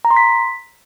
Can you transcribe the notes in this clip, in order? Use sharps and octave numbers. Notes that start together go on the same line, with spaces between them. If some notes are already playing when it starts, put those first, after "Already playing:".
A#5
C6
B6